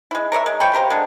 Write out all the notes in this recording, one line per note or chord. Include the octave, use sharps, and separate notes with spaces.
G#3 E4
A#4 C#5 D5 E5
G#3
F3 C#5 G5 B5
G4 A#4 C5 F5
D3 G#3